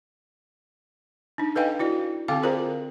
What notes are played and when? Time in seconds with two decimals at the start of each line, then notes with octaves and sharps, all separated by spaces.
1.38 D4 D#4
1.56 A4 B4 D#5 F5 G5 G#5
1.79 E4 F#4 D5
2.28 D3 C4 A4 F5 G5 D6
2.43 F4 G#4 A#4 C5 D5 A#5